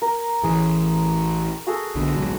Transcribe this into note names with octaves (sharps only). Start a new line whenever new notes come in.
A#4
A1 E3 G#4
F#4 G#4 A4
B1 B2 D3
D1 B1 G#2